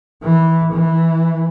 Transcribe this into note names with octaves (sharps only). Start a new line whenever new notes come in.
E3
E3